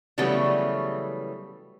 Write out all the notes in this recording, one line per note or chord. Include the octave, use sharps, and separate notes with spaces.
C#3 E3 F#3 G3 A3 B3